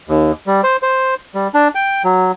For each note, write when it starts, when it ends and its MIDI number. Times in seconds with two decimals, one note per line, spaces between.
0.09 0.32 39
0.47 0.61 55
0.64 0.77 72
0.83 1.15 72
1.35 1.48 55
1.54 1.68 62
1.75 2.02 79
2.04 2.32 54